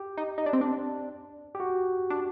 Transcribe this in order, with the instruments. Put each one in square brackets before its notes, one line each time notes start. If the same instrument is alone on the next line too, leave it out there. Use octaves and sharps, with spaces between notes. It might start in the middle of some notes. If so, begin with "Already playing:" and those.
Already playing: [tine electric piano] G4
[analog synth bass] D#4
D#4
D4
C4
D4
[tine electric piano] G4
F#4
[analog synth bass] D4